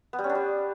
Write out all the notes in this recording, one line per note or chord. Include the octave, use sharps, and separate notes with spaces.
B3
G3
C#4
D4
G3